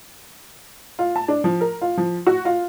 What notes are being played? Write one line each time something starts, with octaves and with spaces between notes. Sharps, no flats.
F4
A5
D4
F3
A#4
F4
F3
F#4
F4